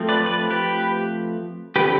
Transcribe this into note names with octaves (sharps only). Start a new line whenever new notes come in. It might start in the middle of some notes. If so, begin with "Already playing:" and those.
Already playing: F3 A3 C4
B4 D5
B4 D5
G4 B4
D3 F3 C4 G4 B4